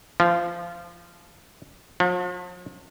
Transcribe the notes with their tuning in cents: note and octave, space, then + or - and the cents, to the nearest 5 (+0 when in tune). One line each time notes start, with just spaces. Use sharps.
F3 -20
F3 +45